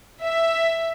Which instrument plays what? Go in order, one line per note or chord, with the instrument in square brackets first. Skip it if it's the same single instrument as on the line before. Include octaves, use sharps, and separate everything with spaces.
[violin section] E5